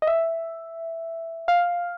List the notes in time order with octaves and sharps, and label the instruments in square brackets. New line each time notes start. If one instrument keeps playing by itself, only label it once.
[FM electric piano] D#5
E5
F5